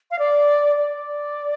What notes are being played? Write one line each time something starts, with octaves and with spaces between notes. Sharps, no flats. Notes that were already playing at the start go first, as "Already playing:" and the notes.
F5
D5
D5